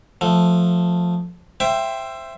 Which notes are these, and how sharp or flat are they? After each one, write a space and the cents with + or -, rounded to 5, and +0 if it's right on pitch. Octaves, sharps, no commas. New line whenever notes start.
F3 +10 A3 +0
C5 +5 E5 +20 G5 +0